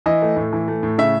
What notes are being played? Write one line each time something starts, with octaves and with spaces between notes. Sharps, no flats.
E3 D#5
A3
A2
E3
A3
A2
C#3 E5